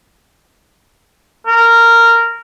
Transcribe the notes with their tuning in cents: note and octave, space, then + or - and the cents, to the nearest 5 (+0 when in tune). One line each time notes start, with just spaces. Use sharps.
A#4 -10